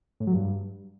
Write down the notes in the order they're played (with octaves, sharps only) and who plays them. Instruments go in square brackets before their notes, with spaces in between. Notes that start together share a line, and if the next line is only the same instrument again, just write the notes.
[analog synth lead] A2
F#3
G2